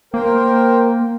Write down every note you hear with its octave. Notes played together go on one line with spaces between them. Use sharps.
A#3 A#4 C5 G5